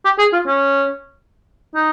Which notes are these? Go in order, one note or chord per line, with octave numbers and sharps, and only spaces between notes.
G4
G#4
F4
C#4
D#4